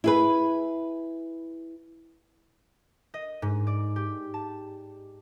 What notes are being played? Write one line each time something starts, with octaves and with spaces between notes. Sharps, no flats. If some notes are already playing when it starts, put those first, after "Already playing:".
E4 G#4 B4
D#5
G#2
D5
G4
A5